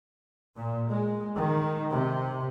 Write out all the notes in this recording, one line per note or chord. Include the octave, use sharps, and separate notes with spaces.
A#2
G#3
D#3
C3